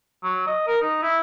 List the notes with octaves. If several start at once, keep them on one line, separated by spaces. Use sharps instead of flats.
F#3
D#5
A#4
D#4
E4